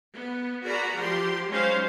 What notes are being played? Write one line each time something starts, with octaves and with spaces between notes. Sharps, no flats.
B3
F#4 G#4 A#4 D5 A#5 B5
F3 G4 C6
F#3 G#3 C#4 D#4 C5 F5